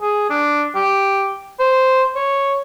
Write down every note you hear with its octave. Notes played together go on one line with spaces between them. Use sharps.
G#4
D4
G4
C5
C#5